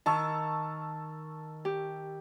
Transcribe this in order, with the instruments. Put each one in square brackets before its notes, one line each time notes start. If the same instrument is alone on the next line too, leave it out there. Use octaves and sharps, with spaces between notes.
[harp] D#3 [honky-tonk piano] A5 C#6 E6
[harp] G4